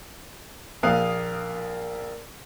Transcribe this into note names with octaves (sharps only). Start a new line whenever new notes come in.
A#1 A#3 F5 D#6 F#6